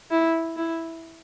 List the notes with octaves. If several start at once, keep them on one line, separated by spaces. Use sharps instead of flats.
E4
E4